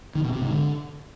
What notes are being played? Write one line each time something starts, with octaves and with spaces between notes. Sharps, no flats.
D#3
B2
C3
G#2
D3